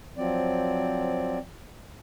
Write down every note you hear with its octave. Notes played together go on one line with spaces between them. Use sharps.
F3 F#3 C4 D5